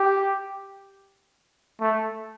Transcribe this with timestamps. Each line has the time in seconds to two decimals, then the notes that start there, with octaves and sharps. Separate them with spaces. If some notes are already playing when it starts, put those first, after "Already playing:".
Already playing: G4
1.81 A3